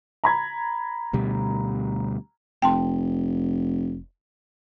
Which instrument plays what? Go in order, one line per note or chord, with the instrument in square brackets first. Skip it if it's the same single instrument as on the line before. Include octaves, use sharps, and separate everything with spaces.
[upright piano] A#5 B5 G#6
[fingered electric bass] D2 B2 G3
[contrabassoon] F1 [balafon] G5 A5 C6